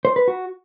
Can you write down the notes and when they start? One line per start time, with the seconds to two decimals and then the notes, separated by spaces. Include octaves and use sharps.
0.05 C5
0.16 B4
0.28 F#4